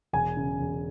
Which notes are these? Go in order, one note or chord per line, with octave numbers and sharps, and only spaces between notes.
E1 G#5
C#3
E1